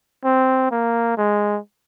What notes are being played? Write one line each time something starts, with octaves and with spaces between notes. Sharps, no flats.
C4
A#3
G#3